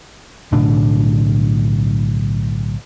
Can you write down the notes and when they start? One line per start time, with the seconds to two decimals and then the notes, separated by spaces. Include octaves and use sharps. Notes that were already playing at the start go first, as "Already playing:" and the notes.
0.52 B1 A2 D3 D4